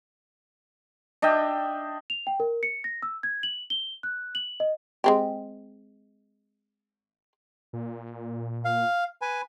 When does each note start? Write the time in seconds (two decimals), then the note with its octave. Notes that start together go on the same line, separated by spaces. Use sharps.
1.22 D4 D#5 E5 G5
2.10 F7
2.27 G5
2.40 A#4
2.63 C#7
2.84 A#6
3.02 E6
3.23 G#6
3.43 F#7
3.70 G7
4.03 F#6
4.35 F#7
4.60 D#5
5.04 G#3 C4 G4
7.73 A#2
8.65 F5
9.22 B4 G#5